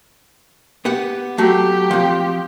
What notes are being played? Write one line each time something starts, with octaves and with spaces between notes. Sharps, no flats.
B3 G4 F#5
F#3 A3 G4
F3 C4